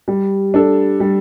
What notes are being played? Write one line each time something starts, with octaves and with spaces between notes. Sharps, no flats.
G3
D4 A4
G3